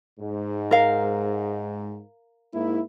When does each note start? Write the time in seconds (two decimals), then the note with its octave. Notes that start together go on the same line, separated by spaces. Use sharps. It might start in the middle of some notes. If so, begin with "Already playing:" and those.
0.20 G#2
0.71 A#4 F5
2.54 G#2 A#3 E4